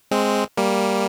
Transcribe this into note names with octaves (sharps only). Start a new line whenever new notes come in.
G#3 C4
G3 A#3